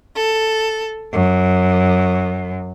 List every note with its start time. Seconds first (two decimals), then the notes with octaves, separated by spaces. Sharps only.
0.16 A4
1.12 F#2